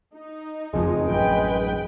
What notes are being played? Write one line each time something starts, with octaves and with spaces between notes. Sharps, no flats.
D#4
F#1 F2 F3 G#3
A1 F#2 B4 G5